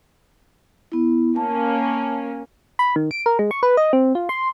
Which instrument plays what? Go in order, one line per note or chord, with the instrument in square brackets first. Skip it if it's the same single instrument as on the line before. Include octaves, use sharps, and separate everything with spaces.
[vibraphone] B3 E4
[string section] A#3 C#4 [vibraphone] A5
[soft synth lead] B5
D#3
D7
A#4
G#3
C#6
B4
D#5
C4
F4
C6